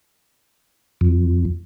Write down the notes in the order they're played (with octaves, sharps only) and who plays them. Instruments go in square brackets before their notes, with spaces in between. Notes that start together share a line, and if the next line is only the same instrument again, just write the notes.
[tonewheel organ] F2